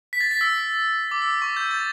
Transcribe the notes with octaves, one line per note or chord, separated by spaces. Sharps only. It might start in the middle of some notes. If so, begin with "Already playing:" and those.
B6
A6
B6
E6
D6
E6
D6
C#6
G6
A6